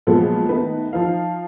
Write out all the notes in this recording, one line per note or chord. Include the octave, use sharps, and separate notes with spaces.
A#2 F3 F#3 G#3 B3
D#3 A3 B3 D#4 B4
F3 D#4 F5